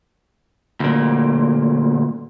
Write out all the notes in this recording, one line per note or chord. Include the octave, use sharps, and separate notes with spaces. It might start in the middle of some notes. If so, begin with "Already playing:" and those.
D2 A#2